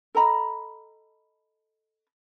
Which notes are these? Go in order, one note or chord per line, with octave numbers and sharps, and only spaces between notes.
A4 D#5 A#5 B5